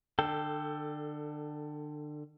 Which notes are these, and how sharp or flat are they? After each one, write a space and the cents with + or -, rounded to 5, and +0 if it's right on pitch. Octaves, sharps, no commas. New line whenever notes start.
D3 +30 A4 +10 G5 +0